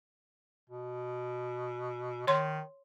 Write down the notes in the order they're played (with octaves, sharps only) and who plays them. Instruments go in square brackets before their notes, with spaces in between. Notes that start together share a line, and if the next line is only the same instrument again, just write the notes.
[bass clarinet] B2
[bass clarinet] D#3 [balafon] C#5 C6